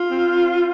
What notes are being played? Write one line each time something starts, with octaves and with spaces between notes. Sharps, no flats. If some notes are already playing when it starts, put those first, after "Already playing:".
Already playing: F4
C4